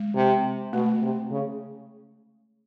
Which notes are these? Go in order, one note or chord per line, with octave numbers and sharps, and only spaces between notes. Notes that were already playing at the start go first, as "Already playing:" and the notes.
Already playing: G#3
C3
B2 A3
C3
C#3